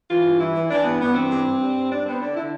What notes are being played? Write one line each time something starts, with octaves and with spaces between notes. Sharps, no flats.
E3 F4
G2
E3 E4
E3
E3 D4
G2 B3
G2 B3
E3 C4
G2
G2
G3
G2
G3 D4
B3 C4
D3 D4
D3 E4